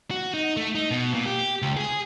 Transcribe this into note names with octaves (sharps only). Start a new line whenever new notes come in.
F#4
D#4
A3
D#4
B2
A#2
G4
C#2
G#4